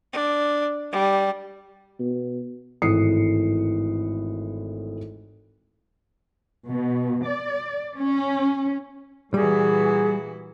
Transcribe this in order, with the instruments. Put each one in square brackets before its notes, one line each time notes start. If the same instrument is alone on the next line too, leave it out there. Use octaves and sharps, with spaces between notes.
[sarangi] D4
G3
[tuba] B2
[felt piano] G#1 A2 E3 D#6 C7 C#7
[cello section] B2
D5
C#4
[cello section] A#2 E3 F#4 [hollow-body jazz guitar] G3 [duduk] G#4